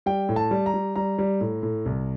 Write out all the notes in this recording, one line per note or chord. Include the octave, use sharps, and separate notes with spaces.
G3 G5
A2
A5
G3
A#5
G3
G3 A#5
G3
A2
A2
C2